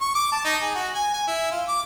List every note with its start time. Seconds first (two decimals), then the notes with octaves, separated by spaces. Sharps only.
0.01 C#6
0.15 D6
0.32 A5
0.45 D#4
0.62 G#4
0.75 F#4
0.95 G#5
1.13 G#5
1.27 E4
1.51 F4
1.68 D6